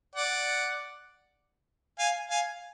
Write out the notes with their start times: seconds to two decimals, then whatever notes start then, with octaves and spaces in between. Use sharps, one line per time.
0.15 D5 F#5
1.99 F5 G#5
2.30 F5 G#5